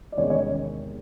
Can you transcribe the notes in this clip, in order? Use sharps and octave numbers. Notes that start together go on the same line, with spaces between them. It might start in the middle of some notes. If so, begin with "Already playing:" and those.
D5
E2 C3 D#3 G#3 C4 C#4 C#5
C#4 C#5